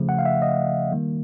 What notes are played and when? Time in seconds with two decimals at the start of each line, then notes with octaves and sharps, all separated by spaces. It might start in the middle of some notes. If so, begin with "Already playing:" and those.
Already playing: C#3 F3 A3
0.09 F#5
0.19 F5
0.25 E5
0.42 D#5
0.92 D#3 G3 A#3